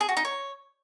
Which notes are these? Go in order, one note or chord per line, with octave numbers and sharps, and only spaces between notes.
G#4
F#4
D#4
C#5